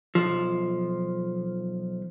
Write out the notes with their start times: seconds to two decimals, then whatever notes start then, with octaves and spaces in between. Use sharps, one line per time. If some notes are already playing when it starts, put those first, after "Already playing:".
0.15 B1 F3